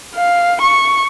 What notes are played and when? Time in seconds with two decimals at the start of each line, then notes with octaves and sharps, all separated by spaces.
0.15 F5
0.61 C#6